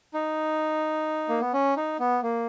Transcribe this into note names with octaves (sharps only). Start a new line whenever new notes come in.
D#4
A#3
B3
C#4
D#4
B3
A#3